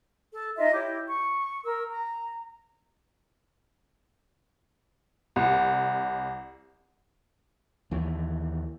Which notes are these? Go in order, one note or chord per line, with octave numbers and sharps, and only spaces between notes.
A4
D#4 F4 D#5 E5
E4 G4 C#5 D6
C#6
A#4 E6
A#5
C2
D#2 E3